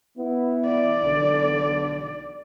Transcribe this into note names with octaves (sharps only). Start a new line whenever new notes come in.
B3 E4
D5
B1 D3